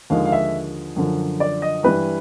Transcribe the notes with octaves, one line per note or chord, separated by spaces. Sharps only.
D#2 D3 F3 G#3 F5
F5
E5
F#2 D3 F3
D5
D#5
G2 E3 G3 B4